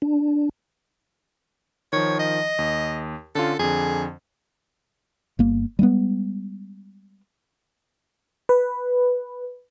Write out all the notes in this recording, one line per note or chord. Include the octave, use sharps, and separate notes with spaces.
D4
D#3 F3 C#5
D#5
D#2
D3 C#4 F4 A4
F2 D3 G#4
G1 A#3
G3 G#3 A#3 B3
B4